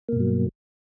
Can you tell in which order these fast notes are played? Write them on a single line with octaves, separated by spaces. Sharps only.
A#3 B2 G2 F#3